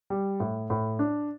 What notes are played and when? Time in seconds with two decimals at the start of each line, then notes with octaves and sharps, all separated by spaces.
0.10 G3
0.40 A2
0.70 A2
0.99 D4